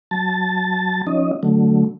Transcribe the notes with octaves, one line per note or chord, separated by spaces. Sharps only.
F#3 A5 A6
F3 C#4 D#4 D#5
D3 F#3 A3